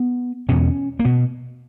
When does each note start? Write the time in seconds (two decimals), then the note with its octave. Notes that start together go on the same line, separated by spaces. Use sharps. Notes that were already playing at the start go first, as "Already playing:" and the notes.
Already playing: B3
0.49 E2 B2 C#4
0.99 A#3
1.05 B2 B3